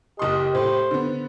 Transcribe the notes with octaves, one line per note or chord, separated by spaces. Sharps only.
F#1 G4 D#5 C6
A2 C5
D3 B3